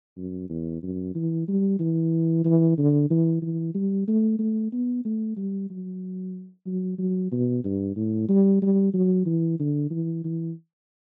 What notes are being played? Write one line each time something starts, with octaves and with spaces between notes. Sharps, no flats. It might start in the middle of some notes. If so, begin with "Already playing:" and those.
F#2
E2
F#2
E3
G3
E3
E3
D3
E3
E3
G3
A3
A3
B3
A3
G3
F#3
F#3
F#3
B2
G2
A2
G3
G3
F#3
E3
D3
E3
E3